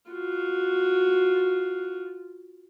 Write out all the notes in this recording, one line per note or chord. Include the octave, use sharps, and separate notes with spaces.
F4 F#4